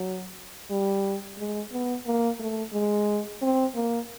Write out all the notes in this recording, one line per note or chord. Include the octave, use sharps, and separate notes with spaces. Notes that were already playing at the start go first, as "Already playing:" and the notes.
Already playing: F#3
G3
G#3
B3
A#3
A3
G#3
C4
A#3